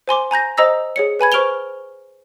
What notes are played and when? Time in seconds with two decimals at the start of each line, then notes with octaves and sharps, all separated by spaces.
0.08 C5 G#5 C6 D6
0.31 G#5 A#5 G6 A#6
0.57 C5 D#5 A#5 D#6 E6 A#6
0.96 G#4 C#5 C#7
1.19 B4 G#5 B5 G#6
1.32 C5 C#6 F6 D7 F7 G7